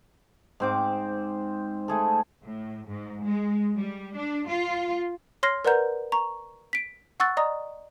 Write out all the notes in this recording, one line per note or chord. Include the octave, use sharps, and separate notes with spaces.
G#2 C4 D6
A3 G#4 A4
A2
G#2
G#3
G3
D4
F4
C#5 C6 F6 A#6 C7
A#4 B4 D5 F#5 A#5 G6
A#5 C#6
B6 D7
F#5 C#6 E6 F#6 A6
D5 D#5 A#5 D#6